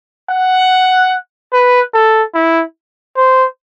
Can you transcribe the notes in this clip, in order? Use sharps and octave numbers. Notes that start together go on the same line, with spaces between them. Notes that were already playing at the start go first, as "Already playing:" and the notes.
F#5
B4
A4
E4
C5